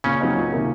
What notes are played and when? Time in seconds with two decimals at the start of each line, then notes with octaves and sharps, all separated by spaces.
0.04 A#2 C#3 C#4
0.20 F#3 C4 D#4
0.36 C#2
0.52 C3 D#3 A#3